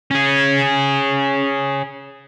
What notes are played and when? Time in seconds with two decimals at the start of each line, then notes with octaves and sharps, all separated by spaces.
0.11 C#4 G#4